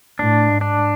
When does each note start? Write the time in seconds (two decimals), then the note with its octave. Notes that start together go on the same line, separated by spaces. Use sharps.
0.19 A2 D4
0.47 G#2
0.61 D4